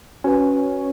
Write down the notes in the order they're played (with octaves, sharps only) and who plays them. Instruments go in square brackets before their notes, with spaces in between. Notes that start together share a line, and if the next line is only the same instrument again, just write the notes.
[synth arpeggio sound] C#4 [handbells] F#4 B4 G#5